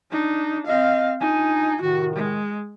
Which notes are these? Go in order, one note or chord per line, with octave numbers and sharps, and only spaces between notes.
D4 D#4
C4 D#5 F5
D4 D#4 F4 G#5
A2 C3 D#3 F#4
G#3